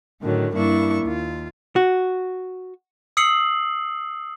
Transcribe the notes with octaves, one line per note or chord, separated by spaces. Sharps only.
A2 D3 D#3 F#3
G2 A#3 D4 E4 C#6
D#2 F4
F#4
D#6 E6 C7 C#7 F#7